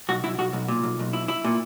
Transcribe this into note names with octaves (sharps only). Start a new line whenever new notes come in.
B1 F#4
B1 E4
B1 F#4
B1
A#2
B1
B1
E4
E4
A#2